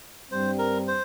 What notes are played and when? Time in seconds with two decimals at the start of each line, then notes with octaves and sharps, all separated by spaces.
0.31 G2 G3 C4 C5
0.59 A#4
0.88 C5